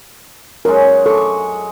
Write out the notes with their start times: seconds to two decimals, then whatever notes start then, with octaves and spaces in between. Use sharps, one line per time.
0.65 F#2 G#3 A#4
1.06 A4 C#6 D6